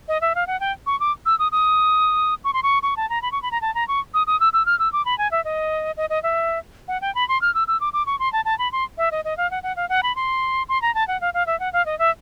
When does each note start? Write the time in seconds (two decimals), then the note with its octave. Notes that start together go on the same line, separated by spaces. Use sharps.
0.08 D#5
0.21 E5
0.35 F5
0.47 F#5
0.60 G5
0.87 C#6
1.00 D6
1.26 E6
1.39 D#6
1.52 D#6
2.44 C#6
2.53 C6
2.63 C#6
2.83 C#6
2.97 A5
3.10 A#5
3.22 B5
3.32 C#6
3.43 B5
3.52 A#5
3.62 A5
3.75 A#5
3.88 C#6
4.14 D#6
4.27 D#6
4.40 E6
4.53 E6
4.66 F6
4.79 E6
4.93 D6
5.05 B5
5.18 G#5
5.31 E5
5.45 D#5
5.97 D#5
6.10 D#5
6.23 E5
6.88 F#5
7.02 G5
7.15 B5
7.29 C6
7.42 F6
7.55 E6
7.68 E6
7.81 D6
7.93 D6
8.06 C#6
8.19 C6
8.33 A5
8.45 A5
8.59 B5
8.72 C6
8.98 E5
9.11 D#5
9.25 D#5
9.37 F5
9.51 F#5
9.63 F#5
9.76 F5
9.89 F#5
10.03 B5
10.16 C6
10.69 C6
10.82 A#5
10.95 A5
11.08 F#5
11.21 F5
11.34 F5
11.47 E5
11.60 F#5
11.73 F5
11.86 D#5
11.99 E5